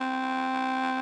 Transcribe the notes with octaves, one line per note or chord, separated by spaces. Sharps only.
C4